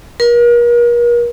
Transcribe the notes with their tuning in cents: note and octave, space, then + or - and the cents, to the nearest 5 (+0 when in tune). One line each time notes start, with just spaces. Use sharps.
A#4 +40